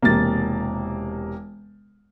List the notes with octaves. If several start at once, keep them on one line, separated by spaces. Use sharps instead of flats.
E1 C3 A#3 A6